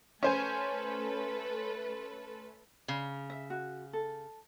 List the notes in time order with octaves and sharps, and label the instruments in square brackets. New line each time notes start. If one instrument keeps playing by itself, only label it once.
[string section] A3 A4 B4 [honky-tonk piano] C#4 C5 G#5
[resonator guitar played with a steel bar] C#3
[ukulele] E5
F#4
A4